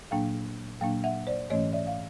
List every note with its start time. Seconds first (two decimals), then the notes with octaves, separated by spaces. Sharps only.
0.11 A#2 F#3 A#3 D4 F5 G5
0.81 A#2 F#3 A#3 D4 F5 G5
1.04 E5 F#5
1.27 C5 D5
1.50 G#2 E3 A3 C#4 C#5 D#5
1.72 D5 E5
1.87 F5